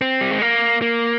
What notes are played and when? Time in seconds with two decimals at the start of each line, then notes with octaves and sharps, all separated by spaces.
0.01 C4
0.21 G3
0.31 G#3
0.42 A#3
0.82 A#3